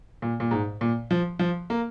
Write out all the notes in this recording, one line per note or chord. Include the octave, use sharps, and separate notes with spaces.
A#2
A#2
G#2
A#2
F3
F3
A#3